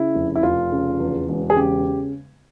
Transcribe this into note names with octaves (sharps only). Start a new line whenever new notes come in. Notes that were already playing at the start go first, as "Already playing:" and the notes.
Already playing: C#3 E4
F1
E4
F1 F4
C#3
E2
E1
G#4
C#3 G4